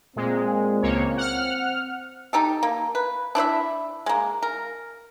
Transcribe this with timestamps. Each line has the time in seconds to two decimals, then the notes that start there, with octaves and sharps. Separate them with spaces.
0.16 A#2 G#3 C4
0.82 C#2 A#3 C#5
1.17 F#5 F6
2.33 D#4 G4 A4
2.63 A#3
2.95 B4
3.35 D4 E4 C5 E5
4.06 G#3 A#3
4.43 A#4